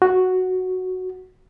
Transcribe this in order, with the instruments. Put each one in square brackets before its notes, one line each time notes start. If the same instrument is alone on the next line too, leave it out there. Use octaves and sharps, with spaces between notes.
[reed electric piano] F#4